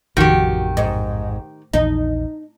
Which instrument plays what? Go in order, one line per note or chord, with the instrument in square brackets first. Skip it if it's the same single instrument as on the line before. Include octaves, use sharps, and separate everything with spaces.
[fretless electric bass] A1 F2 C3 [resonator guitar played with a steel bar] D#3 G4 [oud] F#4
[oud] G#2
[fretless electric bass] A#1 E2 [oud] D#4